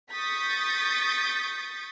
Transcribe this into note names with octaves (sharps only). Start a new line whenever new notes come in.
C#6 D#6 G6 A6 B6